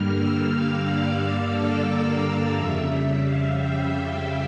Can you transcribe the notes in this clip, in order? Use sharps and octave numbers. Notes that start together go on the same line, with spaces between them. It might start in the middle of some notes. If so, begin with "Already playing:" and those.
Already playing: G2 D3 G3 A#3 F6
E6
F5
D5
D5
A4
A#4
D5
F2 C#3 G3 E5
F5
G5
G5